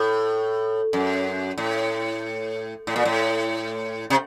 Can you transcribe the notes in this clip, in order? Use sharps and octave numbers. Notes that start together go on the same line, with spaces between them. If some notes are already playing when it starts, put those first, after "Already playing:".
Already playing: A2
F#2
A2
A2
A#2
A2
C3